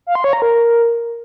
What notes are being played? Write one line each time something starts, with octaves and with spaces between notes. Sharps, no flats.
F5
C6
C#5
A#5
A#4